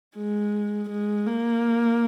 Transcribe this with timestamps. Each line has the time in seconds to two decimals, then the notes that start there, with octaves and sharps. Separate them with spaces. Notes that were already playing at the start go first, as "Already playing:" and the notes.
0.17 G#3
0.90 G#3
1.27 A#3